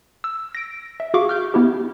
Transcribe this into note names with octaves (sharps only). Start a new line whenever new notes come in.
E6
A#6 D7
E5
F#4 G#4 F5 C#6 D6
F6 G6
B3 E4 G4